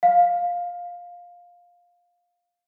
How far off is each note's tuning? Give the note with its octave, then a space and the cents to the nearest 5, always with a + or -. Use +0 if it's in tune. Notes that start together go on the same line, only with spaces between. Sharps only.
F5 +10